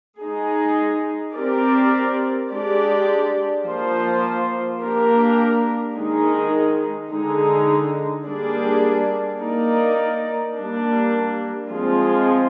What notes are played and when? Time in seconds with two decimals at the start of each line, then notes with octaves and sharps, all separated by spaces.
0.20 G#3 D#4 G#4
1.34 C4 G4 A#4 D5
2.50 G#3 D4 G4 D5
3.65 F3 A#3 F4 C5
4.80 A#3 D4 G4 A#4
5.94 D#3 G#3 D#4 G#4
7.10 D3 G#3 D#4 G#4
8.25 G3 A#3 D4 G#4 D5
9.41 A#3 D#4 A#4 D5
10.56 G3 A#3 D4
11.70 F3 G#3 C4 F4 G#4